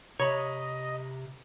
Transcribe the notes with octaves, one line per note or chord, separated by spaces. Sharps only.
C3 C#5 D#5 A#5 B5